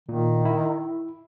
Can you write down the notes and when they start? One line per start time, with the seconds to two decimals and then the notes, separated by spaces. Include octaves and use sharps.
0.09 A#2 D#3
0.45 E4